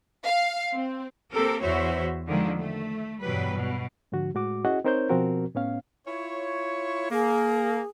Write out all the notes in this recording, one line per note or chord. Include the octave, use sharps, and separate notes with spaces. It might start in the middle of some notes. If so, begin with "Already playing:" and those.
F5
C4
A#3 C4 G4 A4 A#4
E2 E3 F#4 C5 C#5 E5
D3 D#3 F3 G#3 A#3
A3
E2 G2 B2 F#3 G3 B4
B2
G#2 D3 F3 F#4
A2 G#3 F#4 D6
C#4 E4 F#4 G#4 D#5 F#5
C4 D#4 A#4 C5 C#5 G6
B2 F3 C4 F#4 A#4
A2 B3 C#4 F5
E4 F4 C#5
A#3 G#4